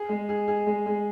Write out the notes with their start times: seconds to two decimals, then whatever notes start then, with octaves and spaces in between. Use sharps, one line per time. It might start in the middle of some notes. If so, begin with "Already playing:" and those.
Already playing: G#4
0.09 G#3
0.29 G#4
0.48 G#4
0.67 G#3
0.86 G#3